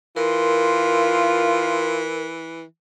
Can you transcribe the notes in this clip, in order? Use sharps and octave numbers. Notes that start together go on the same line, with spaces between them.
E3 F4 A#4 C6